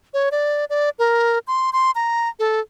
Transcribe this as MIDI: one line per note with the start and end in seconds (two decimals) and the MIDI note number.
0.14 0.29 73
0.32 0.65 74
0.70 0.90 74
0.99 1.39 70
1.47 1.70 84
1.73 1.91 84
1.95 2.29 82
2.39 2.60 69